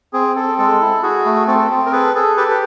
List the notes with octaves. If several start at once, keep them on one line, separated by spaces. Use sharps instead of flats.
C4 G#4
C4 A4
G#3 A4
E4
F#4 G#4
A3
C4 A4
A4
C4
A#4
G#4 A4 B4
G#4 A4
G4 A4 B4
B4